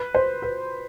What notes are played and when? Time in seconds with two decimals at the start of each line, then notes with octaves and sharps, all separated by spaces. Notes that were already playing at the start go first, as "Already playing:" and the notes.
Already playing: B4
0.15 C5
0.42 B4